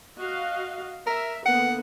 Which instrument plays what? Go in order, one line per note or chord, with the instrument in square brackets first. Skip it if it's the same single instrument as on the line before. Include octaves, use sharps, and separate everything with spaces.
[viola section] F#4 D#5 F5
[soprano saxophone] A#4 [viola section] E5
[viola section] D3 A#3 B3 [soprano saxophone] F#5